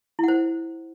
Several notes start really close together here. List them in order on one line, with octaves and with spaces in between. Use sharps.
E4 F#5 C5